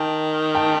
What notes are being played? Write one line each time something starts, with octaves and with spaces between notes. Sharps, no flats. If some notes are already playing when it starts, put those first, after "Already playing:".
Already playing: D#3 G5 A5
G5 A5